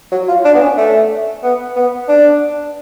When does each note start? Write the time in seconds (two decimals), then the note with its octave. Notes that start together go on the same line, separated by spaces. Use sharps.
0.12 F#3
0.28 F4
0.45 D4
0.55 B3
0.61 C#4
0.77 A3
1.43 B3
1.76 B3
2.08 D4